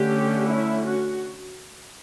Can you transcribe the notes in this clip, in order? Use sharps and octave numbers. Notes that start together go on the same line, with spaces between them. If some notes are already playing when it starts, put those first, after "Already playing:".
Already playing: D3 A3 C#4 G4
E4
F#4